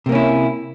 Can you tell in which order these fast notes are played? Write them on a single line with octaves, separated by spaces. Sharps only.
C3 A#3 C#4 E4